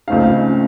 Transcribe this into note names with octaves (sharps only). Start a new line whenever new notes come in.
C#2 C#3 A3 C4 D#4 F5